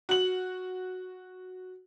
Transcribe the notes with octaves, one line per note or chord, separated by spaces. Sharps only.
F#4 F#7